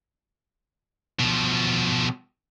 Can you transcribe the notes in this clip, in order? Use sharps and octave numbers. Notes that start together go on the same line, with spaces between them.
B2 F3